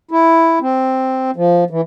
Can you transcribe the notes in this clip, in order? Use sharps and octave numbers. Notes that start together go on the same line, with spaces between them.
E4
C4
F3
E3